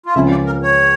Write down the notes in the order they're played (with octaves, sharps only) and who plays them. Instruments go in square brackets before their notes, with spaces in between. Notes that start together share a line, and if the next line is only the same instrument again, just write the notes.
[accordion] F4
[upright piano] C#2 C#3 F3 C#4 [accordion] E4
[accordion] D5
A#4
C#5